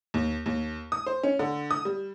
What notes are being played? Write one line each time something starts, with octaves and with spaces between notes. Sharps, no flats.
D#2
D#2
D#6
C5
C#4
D3
D#6
G3